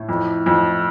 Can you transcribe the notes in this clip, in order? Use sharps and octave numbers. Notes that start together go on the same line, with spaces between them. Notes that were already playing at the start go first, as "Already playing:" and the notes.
Already playing: A2
F2
F2